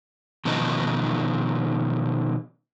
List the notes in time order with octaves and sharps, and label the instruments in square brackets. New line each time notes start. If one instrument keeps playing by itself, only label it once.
[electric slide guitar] B2 D#3 F3 C#4 D#4